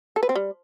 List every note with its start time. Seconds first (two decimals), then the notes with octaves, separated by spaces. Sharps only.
0.16 A4
0.23 B4
0.29 C4
0.36 G3